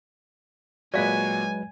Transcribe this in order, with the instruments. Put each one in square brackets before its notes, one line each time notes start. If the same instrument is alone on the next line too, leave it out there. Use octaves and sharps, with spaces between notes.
[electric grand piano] A#2 F#4 [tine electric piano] F#3 G#3 B4 [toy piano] D5 F5 [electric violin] G#5